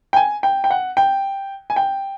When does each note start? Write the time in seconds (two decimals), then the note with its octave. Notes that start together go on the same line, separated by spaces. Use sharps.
0.13 G5
0.16 G#5
0.43 G5
0.64 G5
0.71 F#5
0.97 G5
1.70 G#5
1.76 G5